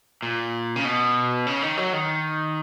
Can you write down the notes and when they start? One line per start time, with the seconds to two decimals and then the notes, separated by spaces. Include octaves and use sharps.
0.23 A#2
0.76 C#3
0.85 B2
1.47 C#3
1.62 D#3
1.77 F#3
1.93 D#3